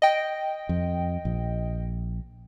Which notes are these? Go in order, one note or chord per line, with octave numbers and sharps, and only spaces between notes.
D#5 G5
F2
A#1